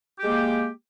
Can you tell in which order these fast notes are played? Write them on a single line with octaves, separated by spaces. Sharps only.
G4 G#3 A#3